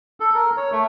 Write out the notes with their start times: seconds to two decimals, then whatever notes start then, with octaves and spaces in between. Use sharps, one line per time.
0.20 A4
0.35 A#4
0.57 C#5
0.72 A3